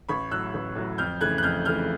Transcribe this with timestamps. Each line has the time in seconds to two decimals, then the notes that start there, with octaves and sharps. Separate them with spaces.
0.09 A1 B5 C#6
0.31 A2 F#3 E6 F#6
0.54 A1
0.76 A2 F#3
0.98 F2 F6 G6
1.21 C#3 E3 A3 F#6 G#6
1.38 F#6
1.43 F2 F6 G6
1.65 C#3 E3 A3 F6 G6